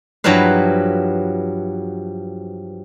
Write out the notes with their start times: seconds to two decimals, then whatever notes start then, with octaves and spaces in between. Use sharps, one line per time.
0.24 G2 F3 F#3 E4 B4 F5